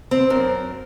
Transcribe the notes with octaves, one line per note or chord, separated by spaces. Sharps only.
C4
F#2 A#4